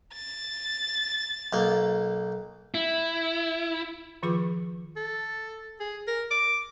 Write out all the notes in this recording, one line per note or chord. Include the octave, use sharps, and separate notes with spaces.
A6
B1 A#3
E4
D#3 F3 F4 G#4 B4 D6
A4
G#4
A#4
D6